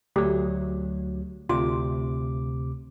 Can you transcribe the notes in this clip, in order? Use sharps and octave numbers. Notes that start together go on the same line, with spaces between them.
D2 F#3 A3 G4
D2 C3 F4 D6